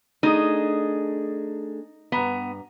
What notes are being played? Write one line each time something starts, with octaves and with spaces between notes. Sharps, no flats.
A3 D4 D#4 G#4 D#5
G2 B3 A#5